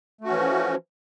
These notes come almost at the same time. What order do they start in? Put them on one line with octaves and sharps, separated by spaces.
A3 F#4 C#4 E3 F3